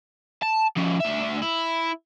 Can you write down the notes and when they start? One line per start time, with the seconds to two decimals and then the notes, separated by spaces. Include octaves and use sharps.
0.42 A5
0.76 F3 C#4
1.00 D2 E5
1.42 E4